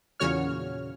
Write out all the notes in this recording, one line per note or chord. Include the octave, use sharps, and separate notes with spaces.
E2 A#2 C#3 F#4 C#5 F6